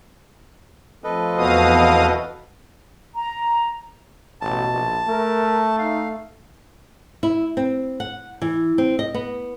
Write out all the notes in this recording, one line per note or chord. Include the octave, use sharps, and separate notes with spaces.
F3 A3 C4 A4 B4 D#5
E2 B2 F5 D#6
A#5
A1 B2 A5
A#1
A3 A#4
D#4 F5
E4
C4
F#5
E3
C4
D#5
B3